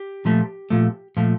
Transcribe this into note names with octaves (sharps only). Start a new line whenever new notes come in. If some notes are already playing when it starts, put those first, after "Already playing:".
Already playing: G4
A#2 F3 A3
A#2 F3 A3
A#2 F3 A3